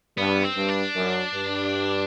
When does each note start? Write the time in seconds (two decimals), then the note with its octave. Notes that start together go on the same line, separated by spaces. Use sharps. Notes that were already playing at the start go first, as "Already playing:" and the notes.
0.18 G2 B3
0.43 C4
0.56 G2
0.69 D4
0.95 F#2
1.33 G2